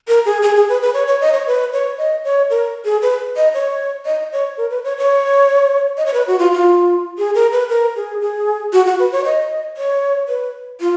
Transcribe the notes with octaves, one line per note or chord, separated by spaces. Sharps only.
A#4
G#4
G#4
G#4
B4
B4
C#5
C#5
D#5
C#5
B4
C#5
D#5
C#5
A#4
G#4
B4
D#5
C#5
D#5
C#5
A#4
B4
C#5
C#5
D#5
C#5
B4
F#4
F4
F4
G#4
A#4
B4
A#4
G#4
G#4
F#4
F#4
B4
C#5
D#5
C#5
B4
F4